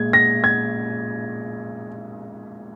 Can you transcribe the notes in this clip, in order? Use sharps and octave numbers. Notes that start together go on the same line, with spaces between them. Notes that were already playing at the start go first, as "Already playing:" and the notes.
Already playing: A#2 G#3 G#6
A#6
G#6